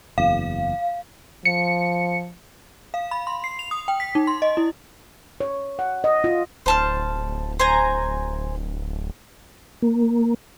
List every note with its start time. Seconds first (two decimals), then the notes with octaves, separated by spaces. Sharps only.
0.18 F#1 E2 F5
1.45 F3 C#7
2.94 F5
3.11 B5
3.27 C6
3.44 C7
3.59 F7
3.71 D#6
3.88 G5
4.00 B6
4.15 D#4
4.27 C6
4.42 D#5
4.57 E4
5.41 C#5
5.79 F#5
6.04 D#5
6.24 F4
6.66 D1 C5 A5 F6
7.60 C5 G#5 A#5
9.82 A#3